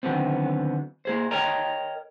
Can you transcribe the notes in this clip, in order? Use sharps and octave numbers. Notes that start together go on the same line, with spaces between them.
D3 D#3 F#3 G#3 B3 C4
A#3 G#4 C5
A#4 C#5 D#5 G5 A#5